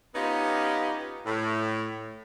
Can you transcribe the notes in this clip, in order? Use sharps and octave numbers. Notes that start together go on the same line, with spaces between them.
B3 C#4 D#4 F4 G4
A2